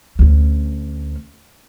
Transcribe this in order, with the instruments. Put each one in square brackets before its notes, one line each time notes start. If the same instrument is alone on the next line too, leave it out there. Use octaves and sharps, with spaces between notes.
[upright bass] D2 C#4